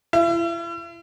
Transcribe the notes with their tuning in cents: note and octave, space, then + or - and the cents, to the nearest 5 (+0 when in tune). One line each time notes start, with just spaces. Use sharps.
E4 +40